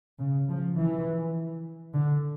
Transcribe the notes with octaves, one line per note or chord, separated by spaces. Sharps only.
C#3
F3
E3
D3